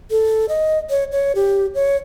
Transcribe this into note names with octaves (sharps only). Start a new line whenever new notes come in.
A4
D#5
C#5
C#5
G4
C#5